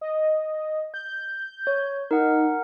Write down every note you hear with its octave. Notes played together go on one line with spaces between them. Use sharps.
D#5
G6
C#5
D#4 A#4 F#5